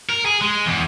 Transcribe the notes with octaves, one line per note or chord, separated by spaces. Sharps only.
A#4
G#4
G#3
E2